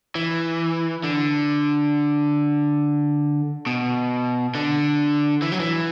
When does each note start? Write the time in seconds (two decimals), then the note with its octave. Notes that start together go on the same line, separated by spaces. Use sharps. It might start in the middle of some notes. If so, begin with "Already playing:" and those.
0.15 E3
1.03 D3
3.67 B2
4.55 D3
5.42 E3
5.52 F#3
5.60 E3